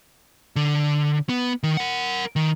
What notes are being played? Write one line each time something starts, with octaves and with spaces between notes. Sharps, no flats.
D3
B3
D#3
A#4 F#5
D#3